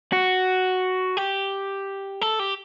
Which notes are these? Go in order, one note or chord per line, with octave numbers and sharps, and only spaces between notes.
F#4
G4
A4
G4